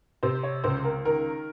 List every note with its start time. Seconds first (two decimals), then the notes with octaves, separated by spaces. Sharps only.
0.23 C3 C5
0.43 C#5
0.64 C#2 C5
0.84 A#4
1.05 D#3 A#4